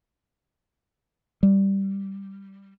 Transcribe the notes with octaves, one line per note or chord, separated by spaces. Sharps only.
G3